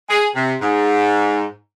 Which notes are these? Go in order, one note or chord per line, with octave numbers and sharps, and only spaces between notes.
G#4
C3
G#2